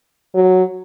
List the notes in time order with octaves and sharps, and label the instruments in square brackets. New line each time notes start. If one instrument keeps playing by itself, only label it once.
[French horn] F#3